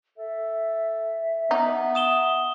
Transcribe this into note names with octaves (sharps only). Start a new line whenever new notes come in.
A4 E5
B3 D#4
D#6 E7 G7